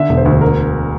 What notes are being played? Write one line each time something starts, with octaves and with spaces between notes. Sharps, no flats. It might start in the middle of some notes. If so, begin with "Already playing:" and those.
Already playing: D3 E5
E1
C5
D2
A#4